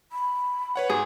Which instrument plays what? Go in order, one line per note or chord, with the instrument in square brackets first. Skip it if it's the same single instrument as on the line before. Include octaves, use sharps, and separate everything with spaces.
[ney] B5
[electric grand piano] B4 C#5 F#5
[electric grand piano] G#2 [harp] G#4